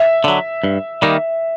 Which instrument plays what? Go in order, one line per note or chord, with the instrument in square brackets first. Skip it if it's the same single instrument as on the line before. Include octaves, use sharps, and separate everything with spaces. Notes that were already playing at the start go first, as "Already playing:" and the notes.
Already playing: [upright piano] E5
[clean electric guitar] D3 F#3
G2
D#3 G3 A#3 D#4